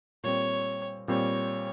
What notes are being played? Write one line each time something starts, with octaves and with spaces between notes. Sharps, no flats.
A#2 G3 C4 C#5
A#2 G3 C4 C#5